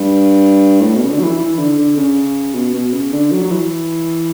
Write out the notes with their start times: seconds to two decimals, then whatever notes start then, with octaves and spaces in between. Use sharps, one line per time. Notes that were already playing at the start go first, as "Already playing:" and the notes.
Already playing: G2
0.81 A2
0.96 B2
1.03 C#3
1.10 D3
1.20 F#3
1.24 E3
1.39 E3
1.59 D3
1.78 D3
1.97 C#3
2.55 B2
2.74 B2
2.94 C#3
3.12 D3
3.32 F#3
3.44 F#3
3.51 E3